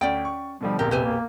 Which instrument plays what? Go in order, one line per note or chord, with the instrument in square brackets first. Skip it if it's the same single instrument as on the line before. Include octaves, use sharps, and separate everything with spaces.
[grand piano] D2 [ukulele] C#4 D5 G5
[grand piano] C#6
[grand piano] B2 D3 F3 [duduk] G3
[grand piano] E1 A#1 F2 [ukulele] G4 [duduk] A#4
[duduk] C3 [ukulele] G4 B4 G#5
[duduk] A#3